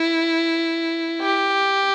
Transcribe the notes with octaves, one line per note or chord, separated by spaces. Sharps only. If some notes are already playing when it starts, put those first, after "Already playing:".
Already playing: E4
G4